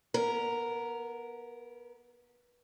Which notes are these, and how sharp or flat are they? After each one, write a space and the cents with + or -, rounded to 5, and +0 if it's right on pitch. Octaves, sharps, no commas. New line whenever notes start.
B3 -25 A#4 +0